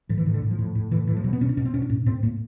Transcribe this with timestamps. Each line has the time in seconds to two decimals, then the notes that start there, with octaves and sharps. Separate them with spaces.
0.09 A2 F3
0.18 E3
0.26 A2 D#3
0.34 D3
0.42 A2
0.51 F3
0.59 A2
0.75 A2
0.91 A2 E3
1.07 A2 E3
1.17 F3
1.24 B2 F#3
1.33 B3
1.41 B2 C#4
1.49 D4
1.57 B2 C#4
1.65 C4
1.74 B2 C#4
1.82 D4
1.90 A2 C#4
2.06 A2 C4
2.23 A2 A#3